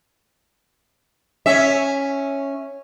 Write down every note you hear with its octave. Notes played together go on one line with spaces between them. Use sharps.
C#4 E5